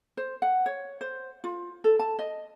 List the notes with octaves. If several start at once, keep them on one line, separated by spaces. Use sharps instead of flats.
C5
F#5
C#5
C5
F4
A4
A5
D#5